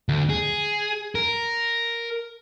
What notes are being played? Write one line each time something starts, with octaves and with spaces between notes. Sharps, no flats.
D2
G#4
A#4